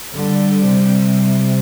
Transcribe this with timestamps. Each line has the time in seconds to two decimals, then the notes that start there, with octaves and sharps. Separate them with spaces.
0.13 D3 G3
0.62 C3